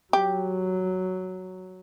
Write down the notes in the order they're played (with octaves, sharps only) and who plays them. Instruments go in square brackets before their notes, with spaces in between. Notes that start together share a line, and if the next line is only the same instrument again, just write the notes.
[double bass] F#3 [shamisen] G4